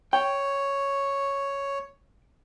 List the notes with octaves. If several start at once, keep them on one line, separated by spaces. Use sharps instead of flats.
C#5 G5